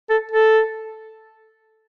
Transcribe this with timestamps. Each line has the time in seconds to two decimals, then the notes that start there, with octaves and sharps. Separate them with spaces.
0.09 A4
0.31 A4